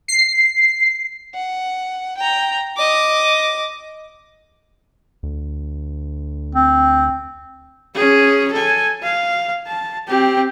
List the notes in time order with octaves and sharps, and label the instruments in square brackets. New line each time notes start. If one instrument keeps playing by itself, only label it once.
[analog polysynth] C7
[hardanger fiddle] F#5
G5 A#5
D#5 D6
[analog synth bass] D2
[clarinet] C4
[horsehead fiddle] C#4 G#4
A4 G#5
F5
A5
C4 G4